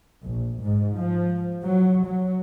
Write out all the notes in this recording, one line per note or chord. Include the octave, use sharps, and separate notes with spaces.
A#1
G#2
F3
F#3
F#3